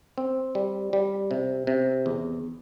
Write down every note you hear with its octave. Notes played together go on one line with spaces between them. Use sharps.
C4
G3
G3
C3
C3
E2